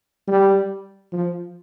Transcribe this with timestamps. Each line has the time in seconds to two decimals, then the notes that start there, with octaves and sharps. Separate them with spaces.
0.28 G3
1.13 F3